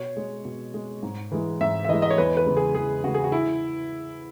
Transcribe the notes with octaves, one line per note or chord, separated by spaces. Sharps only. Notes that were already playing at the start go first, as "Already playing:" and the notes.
Already playing: B2 C#5
G#3
B2
G#3
G#2
E3 G#3
G#2 E5
E5
E3 G#3 D#5
D#5
C#5
E2 B4
B4
C#3 G#3
G#4
E2 G#4
C#3 G#3 F#4
G#4
F#4
E4